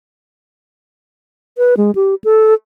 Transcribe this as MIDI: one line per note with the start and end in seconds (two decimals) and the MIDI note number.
1.58 1.75 71
1.77 1.91 56
1.95 2.15 67
2.24 2.54 69